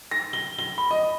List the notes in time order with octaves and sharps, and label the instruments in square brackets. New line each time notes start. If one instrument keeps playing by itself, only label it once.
[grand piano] A#6
G7
G7
B5
D#5